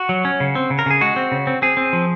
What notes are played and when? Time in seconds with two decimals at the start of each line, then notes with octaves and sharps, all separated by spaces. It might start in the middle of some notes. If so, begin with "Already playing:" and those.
Already playing: F#4
0.09 F#3
0.25 C#4
0.40 C#3
0.55 C4
0.70 C#3
0.79 A#4
0.86 C#3 G#4
1.01 G#3 F#4
1.16 C4
1.32 C#3
1.47 C4
1.62 C4 G#4
1.77 C4
1.93 F3